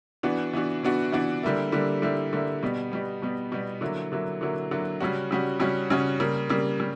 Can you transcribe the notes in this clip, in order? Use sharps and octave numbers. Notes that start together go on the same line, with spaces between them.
E3 B3 D4 F#4
E3 B3 D4 F#4
E3 B3 D4 F#4
E3 B3 D4 F#4
D3 G3 A#3 E4
D3 G3 A#3 E4
D3 G3 A#3 E4
D3 G3 A#3 E4
B2 G3 B3
B2 G3 B3
B2 G3 B3
B2 G3 B3
D3 F#3 A#3 E4
D3 F#3 A#3 E4
D3 F#3 A#3 E4
D3 F#3 A#3 E4
C#3 G3 C#4 F#4
C#3 G3 C#4 F#4
C#3 G3 C#4 F#4
C#3 G3 C#4 F#4
C#3 G3 A#3
C#3 G3 A#3
C#3 G3